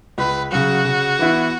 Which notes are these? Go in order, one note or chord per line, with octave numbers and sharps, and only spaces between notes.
C#2 B4
C#3 F#3 F#4
C#3
E3 B3 E4 B4